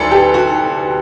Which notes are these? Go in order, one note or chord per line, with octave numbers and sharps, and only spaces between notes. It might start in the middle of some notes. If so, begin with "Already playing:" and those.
Already playing: D2 D3 F#3 A4 B4 D5
G4
F#4